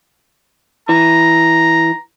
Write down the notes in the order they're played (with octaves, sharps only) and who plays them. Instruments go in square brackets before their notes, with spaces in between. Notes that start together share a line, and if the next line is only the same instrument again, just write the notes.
[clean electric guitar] E3 [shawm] A#5